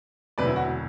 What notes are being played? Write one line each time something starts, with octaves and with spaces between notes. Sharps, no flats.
E1 D2 C3 F#3 B4 D5
E4
F#4